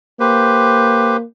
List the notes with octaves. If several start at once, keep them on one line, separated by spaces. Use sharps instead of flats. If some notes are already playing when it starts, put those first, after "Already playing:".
A#3 G4 B4 C5